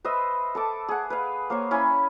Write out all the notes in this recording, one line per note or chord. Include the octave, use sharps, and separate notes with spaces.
B4 C5 D#5 E5
A4 A5 D6
G#4 F#5
B4 F5
A#3 C5 C#5
C#4 E4 G#5 B5